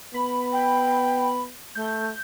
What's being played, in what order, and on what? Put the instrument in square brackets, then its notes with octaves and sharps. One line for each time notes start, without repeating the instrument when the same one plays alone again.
[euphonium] B3 [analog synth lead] B5
[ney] G5
[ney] A3 [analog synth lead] G6